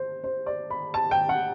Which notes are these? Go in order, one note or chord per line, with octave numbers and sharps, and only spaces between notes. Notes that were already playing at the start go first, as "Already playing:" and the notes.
Already playing: C5
C5
D5
B5
A5
G5
F#5